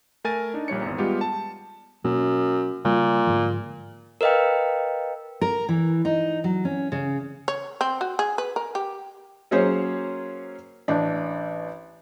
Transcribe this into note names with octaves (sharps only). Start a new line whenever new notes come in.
A3 A#4 G#5 A6 D#7
D4 D#4
A#1 G3 C#5 C#7
G#1 E2
G3 G#3 B3 F4 G4
A5
F#2 B2 F#3 A#3
A#2 C#3 G3
G#2 D3 F3
A#4 B4 D#5 F5 G5
A#4
E3
D#4
F#3
C#4
C#3
C#5
C4
F#4
G#4
B4
A#4
G4
F#3 A#3 C#4 G#4 C5 C#5
A1 D4